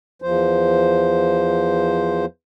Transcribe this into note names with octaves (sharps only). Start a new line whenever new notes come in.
E2 F3 C5